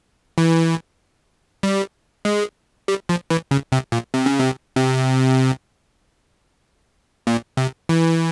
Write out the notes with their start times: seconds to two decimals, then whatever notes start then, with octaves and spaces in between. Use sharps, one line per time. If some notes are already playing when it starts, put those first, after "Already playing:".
0.38 E3
1.63 G3
2.25 G#3
2.88 G3
3.09 F3
3.30 E3
3.51 C#3
3.72 C3
3.92 A#2
4.14 C3
4.26 C#3
4.39 C3
4.76 C3
7.27 A#2
7.57 C3
7.89 E3